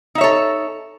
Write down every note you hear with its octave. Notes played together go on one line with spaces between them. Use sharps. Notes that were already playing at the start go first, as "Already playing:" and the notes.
D#4 A4 C#5 E5